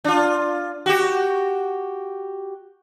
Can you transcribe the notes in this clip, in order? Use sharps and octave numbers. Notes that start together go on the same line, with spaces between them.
D4 F4
F#4 G4